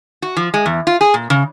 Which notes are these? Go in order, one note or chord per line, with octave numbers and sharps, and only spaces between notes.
F#4
F3
G#3
E2
F4
G#4
A#2
C#3